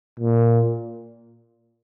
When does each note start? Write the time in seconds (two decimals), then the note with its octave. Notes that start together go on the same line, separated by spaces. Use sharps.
0.20 A#2